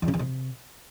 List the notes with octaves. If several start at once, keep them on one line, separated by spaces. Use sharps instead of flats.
E2
C#3
E2
C3